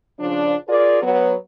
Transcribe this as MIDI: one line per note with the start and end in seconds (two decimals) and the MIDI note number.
0.19 0.55 49
0.19 0.55 53
0.19 0.55 62
0.69 1.01 65
0.69 1.01 68
0.69 1.01 70
0.69 1.01 74
1.03 1.34 54
1.03 1.34 59